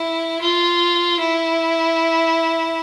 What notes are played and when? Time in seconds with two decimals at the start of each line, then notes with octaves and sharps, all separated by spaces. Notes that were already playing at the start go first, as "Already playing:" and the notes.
Already playing: E4
0.41 F4
1.20 E4